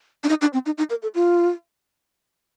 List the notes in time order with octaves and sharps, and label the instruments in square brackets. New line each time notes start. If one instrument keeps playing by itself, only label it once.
[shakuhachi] D4
D#4
D4
C4
D#4
D#4
A#4
A4
F4